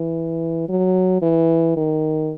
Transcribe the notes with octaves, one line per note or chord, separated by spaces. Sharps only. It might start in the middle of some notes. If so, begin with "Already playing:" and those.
Already playing: E3
F#3
E3
D#3